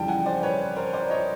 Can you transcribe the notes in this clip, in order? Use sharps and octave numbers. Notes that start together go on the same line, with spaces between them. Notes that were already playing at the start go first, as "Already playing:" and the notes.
Already playing: F2 C#3 E3 G3 G5 A5
F#5 G#5
C5 D5
B4 C#5
A#4 C5
C5 D5
C#5 D#5